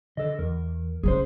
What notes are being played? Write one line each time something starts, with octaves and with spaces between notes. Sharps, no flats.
D3 A4 D#5
E2 A#4
C#3 C#4 G#4 C5